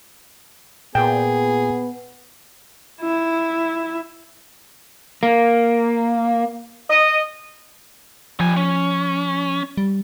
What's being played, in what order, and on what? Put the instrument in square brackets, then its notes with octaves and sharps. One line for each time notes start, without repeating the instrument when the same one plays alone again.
[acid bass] A#2 [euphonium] B3 [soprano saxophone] G#4 [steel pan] G5
[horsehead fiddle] E4
[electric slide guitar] A#3
[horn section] D#5
[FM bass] F3 [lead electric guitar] G3 G#5
[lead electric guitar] C#4
[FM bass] G3